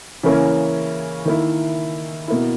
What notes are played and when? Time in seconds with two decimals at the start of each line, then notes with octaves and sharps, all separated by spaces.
0.23 C#3 E3 A#3 C#4 E4
1.25 D#3 A#3 E4
2.28 B2 A#3 E4